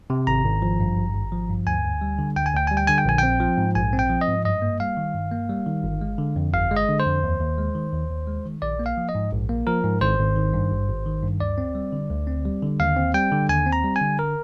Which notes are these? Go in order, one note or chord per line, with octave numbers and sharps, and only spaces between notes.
C3
G#1 A#5
G#1
F3
G2
G#1
G#1
F3
G2
D2 G#5
D2
G3
D3
D2 G5
G#5
D2 G5
G3 G#5
G5
D3 G#5
G5
A#1 G#5
C4 G5
F3
G#2
A#1 G#5
C4
G5
F3
D#5
G#2
G2 D#5
A#3
G3 F5
D#3
G2
A#3
G3
D#3
G1
G#3
D3
F2
G1 F5
G#3
D#5
D3
C5
F2
D#2
D#2
G#3
D#3
D#2
D#2
G#3
D#3
A#1 D5
A#3
F5
F3
D#5
G#2
A#1
A#3
F3 A#4
G#2
G#1 C5
G#1
D#3
G2
G#1
G#1
D#3
G2
D2 D5
C4
G3
D3
D2
C4
G3
D3
D#2 F5
C4
G3 G5
D3
D#2 G#5
C4
A#5
G3
G#5
D3
A#4